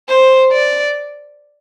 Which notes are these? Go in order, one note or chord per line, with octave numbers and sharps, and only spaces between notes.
C5
D5